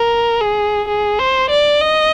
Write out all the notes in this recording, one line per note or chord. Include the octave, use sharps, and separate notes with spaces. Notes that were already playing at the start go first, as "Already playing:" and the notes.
Already playing: A#4
G#4
G#4
C5
D5
D#5